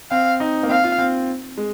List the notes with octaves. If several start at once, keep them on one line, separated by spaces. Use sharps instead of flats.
C4 F5
D#4
A#3
C4 F5
F4
C4
G#3